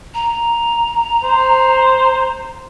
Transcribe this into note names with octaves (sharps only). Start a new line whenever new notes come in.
A#5
C5